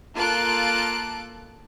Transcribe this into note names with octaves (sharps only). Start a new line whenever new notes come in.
A#3 F4 A4 A5 F#6 D7